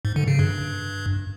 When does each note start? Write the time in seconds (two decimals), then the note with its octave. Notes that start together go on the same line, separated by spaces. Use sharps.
0.05 G#2
0.16 D3
0.28 C#3
0.39 G2
0.50 G2